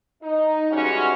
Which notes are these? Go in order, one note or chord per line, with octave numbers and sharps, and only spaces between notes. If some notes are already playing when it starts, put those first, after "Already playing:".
D#4
E3 G3 G#3 C#4 F#4